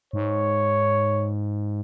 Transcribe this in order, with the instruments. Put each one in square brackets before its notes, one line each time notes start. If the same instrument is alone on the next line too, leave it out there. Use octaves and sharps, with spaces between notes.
[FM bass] G#2 [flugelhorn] C#5